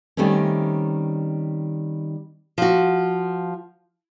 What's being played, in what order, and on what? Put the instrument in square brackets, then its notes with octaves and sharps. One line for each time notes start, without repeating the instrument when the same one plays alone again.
[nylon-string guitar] D#3 G3 A3 C4 C#4
F3 F#4